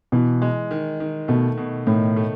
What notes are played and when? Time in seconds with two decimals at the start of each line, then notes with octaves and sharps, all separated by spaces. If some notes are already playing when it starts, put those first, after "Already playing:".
0.12 B2 E3
0.42 G#3
0.71 D#3
1.00 D#3
1.28 B2 A3
1.57 B2
1.87 A2 D#3
2.16 A3